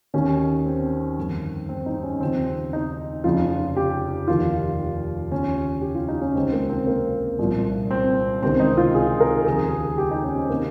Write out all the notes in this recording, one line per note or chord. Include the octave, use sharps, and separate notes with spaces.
D#2 D#3 C#4
C4
G1 F2 D#3
C4
D#4
C#4
D#2 C#3 F3 C4
D#4
F1 F2 C#3 F3 F4
G4
F1 D#2 D#3 F4
D#2 C#3 F3 C#4
G4
F4
D#4
C#4
C#2 C3 D#3 C4
A#3
C4
A#3
C2 A#2 F3
C4
C#2 C3 D#3 C4
D#4
F4
G#4
A#4
D#2 C#3 F3 G#4
G4
D#4
C#4
C4
C3 D#3 A#3